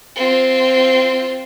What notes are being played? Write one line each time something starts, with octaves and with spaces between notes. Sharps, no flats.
C4 F4